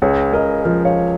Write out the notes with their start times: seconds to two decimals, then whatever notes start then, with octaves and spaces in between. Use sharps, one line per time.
0.02 C#2 G#4 C#5
0.33 C#2 A#4 D#5
0.64 F3 A#4 D#5
0.85 C#5 F5